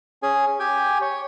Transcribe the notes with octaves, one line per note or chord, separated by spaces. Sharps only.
C#4 G#4 G#5
G4 G5 G#5
C#5